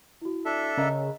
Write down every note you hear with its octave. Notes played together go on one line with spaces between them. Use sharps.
E4 F#4
D4 A4 E5
C#3 A#4 D#5 A#5